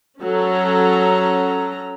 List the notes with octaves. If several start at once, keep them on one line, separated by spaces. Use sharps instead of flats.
F#3 C#4 A4 A#5